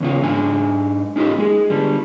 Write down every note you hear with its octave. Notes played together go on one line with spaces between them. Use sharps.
E2 C#3 F4
G#2 D4 G#5
C#4 D#4 F4 G4
G#3 G#4
D3 G3